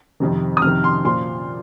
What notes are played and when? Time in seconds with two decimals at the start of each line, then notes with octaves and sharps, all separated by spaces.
0.20 F2 C3 D#3
0.57 D#6
0.62 F2 C3 D#3 F6
0.84 C6
1.04 A#2 F3 C6